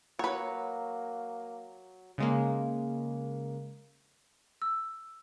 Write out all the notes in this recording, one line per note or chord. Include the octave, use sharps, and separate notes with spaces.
F#3 A#3 B4 C#5
C#3 G#3 A#3
E6